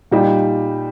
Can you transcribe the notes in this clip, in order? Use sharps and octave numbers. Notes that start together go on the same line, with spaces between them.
A#2 G3 D#4 G4